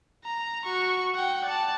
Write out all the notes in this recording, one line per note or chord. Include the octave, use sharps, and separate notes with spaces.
A#5
F#4 C#6
F#5 G5
D5 A5